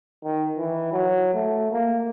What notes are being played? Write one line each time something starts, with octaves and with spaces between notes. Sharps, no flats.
D#3
E3
F#3
A3
A#3